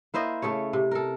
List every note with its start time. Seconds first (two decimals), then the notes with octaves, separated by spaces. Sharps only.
0.14 A#3 E4 C5 D#5
0.42 C#3 A3 A4 C#5
0.73 C3
0.91 A4 A#4